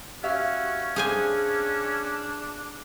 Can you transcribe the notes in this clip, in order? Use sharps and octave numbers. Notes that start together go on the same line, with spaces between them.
C#4 F#4 G4 E5 F5
D4 G#4 C5 G#5